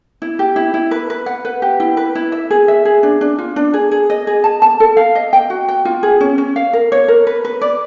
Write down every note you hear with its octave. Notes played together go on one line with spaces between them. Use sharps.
E4
G4
E4
E4
B4
B4
F#5
B4
G4
E4
B4
E4
E5
G#4
E5
G#4
D4
D4
F4
D4
G#4
G#4
D#5
G#4
A5
A5
A4
F5
D#5
G5
F#4
G5
F4
G#4
C#4
C#4
F5
A#4
C#5
A#4
B4
B4
D5